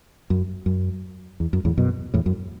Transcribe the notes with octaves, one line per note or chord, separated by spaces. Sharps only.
F#2
F#2
E2
F#2
E2 A2
F#2 B2
E2 A2
F#2